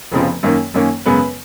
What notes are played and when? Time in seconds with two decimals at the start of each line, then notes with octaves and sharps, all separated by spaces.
0.12 F1 F2 C#3 F3 B3
0.43 F#2 D#3 A#3 C#4
0.74 F#2 D#3 A#3 C#4
1.06 F#2 C#3 G#3 B3 B4